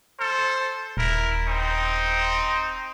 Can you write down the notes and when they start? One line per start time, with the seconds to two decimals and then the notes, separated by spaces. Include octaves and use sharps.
0.19 A4 C5
0.97 D#1 E4 A#4
1.47 C4 D#4